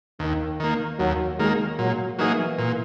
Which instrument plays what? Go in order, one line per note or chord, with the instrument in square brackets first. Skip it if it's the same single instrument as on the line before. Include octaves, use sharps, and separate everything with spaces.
[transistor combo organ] D#2 [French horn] D#3
[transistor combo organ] D#3 A#3
[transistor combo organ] D#2 [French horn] F#3
[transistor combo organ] D#3 A#3 [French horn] G#3
[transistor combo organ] A#2 [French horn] F#3
[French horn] E3 [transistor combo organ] F#3 A#3 D#4 G#4
[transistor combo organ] A#2